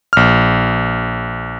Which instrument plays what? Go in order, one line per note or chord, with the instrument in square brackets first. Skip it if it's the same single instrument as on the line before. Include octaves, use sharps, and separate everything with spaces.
[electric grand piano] A#1 F6